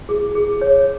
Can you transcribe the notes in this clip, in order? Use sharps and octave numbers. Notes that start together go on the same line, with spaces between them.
G#4
G#4
C#5